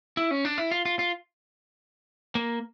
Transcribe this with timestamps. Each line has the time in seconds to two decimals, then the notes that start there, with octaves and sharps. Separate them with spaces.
0.17 E4
0.31 C#4
0.45 D4
0.58 E4
0.71 F4
0.85 F4
0.99 F4
2.35 A#3